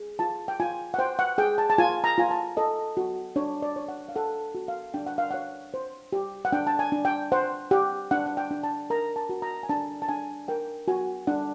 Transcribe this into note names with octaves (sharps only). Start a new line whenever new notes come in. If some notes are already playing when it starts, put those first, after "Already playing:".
Already playing: G#4
F4 A5
G5
F4 G#5
F#5
C5 G5
F#5
G#4 G5
A5
A5
F4 G#5
A#5
F4 G#5
A5
A4 D#5
F#4
D4 C#5
D5
C#5
F#5
F5
A4 F#5
F#4
F5
D4 G5
F#5
F5
C#5 F#5
C5
G4
F#5
D4 G5
A5
G#5
D4
G5
C5 F#5
G4 F#5
D4 F#5
F#5
G5
D4
A5
A#4 A#5
A5
F#4
A#5
G#5
D4 A5
A5
D4 G#5
A#4 G5
F#4 G#5
D4 F#5